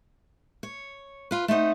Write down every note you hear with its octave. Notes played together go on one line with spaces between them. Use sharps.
C#5
F4 B4
A3 C4 D#4 F#5